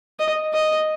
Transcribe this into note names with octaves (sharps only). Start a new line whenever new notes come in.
D#5
D#5